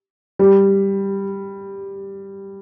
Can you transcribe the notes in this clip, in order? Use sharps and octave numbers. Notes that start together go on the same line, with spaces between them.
G3